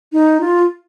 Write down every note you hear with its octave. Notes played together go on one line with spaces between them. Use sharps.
D#4
F4